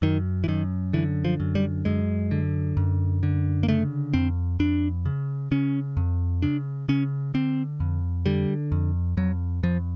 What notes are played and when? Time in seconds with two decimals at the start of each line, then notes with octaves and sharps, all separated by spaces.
0.02 F#2 D#3
0.44 E3
0.48 F#2 D#3
0.93 D3 E3
1.25 F3
1.40 F#2
1.55 G3
1.85 F#2 G#3
2.31 D3
2.77 F#2
3.23 D3
3.63 A#3
3.68 C#3 A3
4.14 F2 C4
4.59 F2 D4
5.05 C#3
5.51 C#3 C#4
5.97 F2
6.42 C#3 D4
6.89 C#3 C#4
7.34 D3 C4
7.80 F2
8.26 D3 G3
8.72 F2
9.17 F2 F#3
9.63 F2 F3